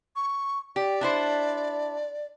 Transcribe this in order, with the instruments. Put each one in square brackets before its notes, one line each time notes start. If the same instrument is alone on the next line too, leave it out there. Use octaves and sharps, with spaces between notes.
[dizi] C#6
[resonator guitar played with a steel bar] G4 [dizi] D5
[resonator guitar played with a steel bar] D4 E4 C5